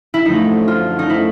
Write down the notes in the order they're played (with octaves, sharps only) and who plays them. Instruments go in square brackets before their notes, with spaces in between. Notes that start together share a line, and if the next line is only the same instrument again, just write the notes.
[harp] E4
[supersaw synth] F#2 D3 F3 A3 [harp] D#4
[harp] F4
D#4
E4